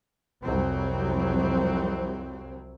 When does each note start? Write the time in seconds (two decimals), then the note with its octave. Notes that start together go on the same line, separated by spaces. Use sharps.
0.42 C2 F2 F#3 C4